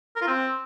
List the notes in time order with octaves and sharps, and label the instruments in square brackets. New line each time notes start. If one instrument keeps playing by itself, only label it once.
[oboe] A#4
F4
C4